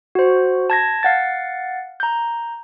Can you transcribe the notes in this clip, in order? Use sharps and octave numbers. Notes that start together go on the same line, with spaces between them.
F#4 C5
A5 G#6 A#6
F5 F#5 A6
A#5 G6